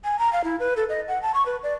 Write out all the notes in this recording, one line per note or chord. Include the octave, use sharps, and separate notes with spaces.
G#5
A#5
F5
E4
B4
A4
D#5
F#5
A5
C#6
B4
D5